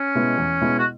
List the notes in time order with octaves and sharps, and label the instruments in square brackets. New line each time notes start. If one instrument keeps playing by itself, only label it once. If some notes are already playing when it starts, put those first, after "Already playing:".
Already playing: [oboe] C#4
[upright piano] B2 G#3 B3 E4
E2
B2 G#3 B3 E4
[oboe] F#4